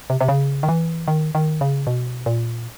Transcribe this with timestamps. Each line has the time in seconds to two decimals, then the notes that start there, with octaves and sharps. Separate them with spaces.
0.10 C3
0.21 C3
0.28 C#3
0.63 D#3
0.68 E3
1.08 D#3
1.35 D#3
1.61 C#3
1.87 B2
2.26 A#2